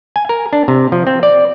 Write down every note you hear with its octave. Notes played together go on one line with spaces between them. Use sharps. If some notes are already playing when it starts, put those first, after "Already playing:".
G#5
A#4
D4
C3
F3
C4
D5